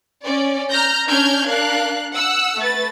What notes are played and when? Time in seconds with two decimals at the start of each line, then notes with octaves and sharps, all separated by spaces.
0.24 C#4 D5
0.71 A#5 F6 G6 A#6
1.07 C#4 D4 F6 G6 G#6
1.47 D4 A#4 F5 F#6
2.13 F#5 E6
2.58 A3 B4 A6